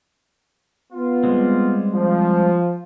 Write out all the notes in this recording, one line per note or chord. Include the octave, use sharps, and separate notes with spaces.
B3 F4
G3 G#3 C4
F3